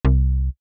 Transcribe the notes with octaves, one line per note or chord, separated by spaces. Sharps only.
C2